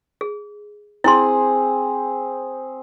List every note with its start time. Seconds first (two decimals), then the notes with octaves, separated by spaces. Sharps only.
0.21 G#4
1.04 C4 E4 G#4 C6